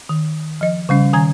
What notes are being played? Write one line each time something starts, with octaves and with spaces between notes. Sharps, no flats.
D#3
F3 D#5
C#3 G3 C#4
D#3 G#5 A#5 G#6